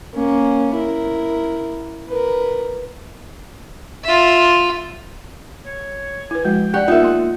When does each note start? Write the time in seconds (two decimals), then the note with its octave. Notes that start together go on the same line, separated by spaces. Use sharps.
0.14 A#3 C#4
0.74 E4 A#4
2.08 A#4 B4
4.04 F4 E5
5.65 C#5
6.31 E4 B4 G#5
6.44 F3 G#3 F#4 G5
6.74 G4 D5 F#5 C#6
6.88 B3 D#4 F4 A#4 E5
7.02 A#3 C6